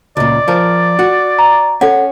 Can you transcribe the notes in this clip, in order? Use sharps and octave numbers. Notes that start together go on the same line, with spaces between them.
C#2 A#2 D5
F3 F4 A#4
F#4
A#5
C#4 A4 F#5